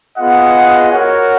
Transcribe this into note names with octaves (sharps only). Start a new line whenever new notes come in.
B3 F4 G#4 D#5 F#5
F#4 A#4 C#5 F#5